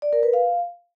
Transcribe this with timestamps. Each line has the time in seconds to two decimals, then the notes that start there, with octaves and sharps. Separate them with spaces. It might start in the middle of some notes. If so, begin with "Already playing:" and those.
0.02 D5
0.13 A#4
0.23 B4
0.33 F5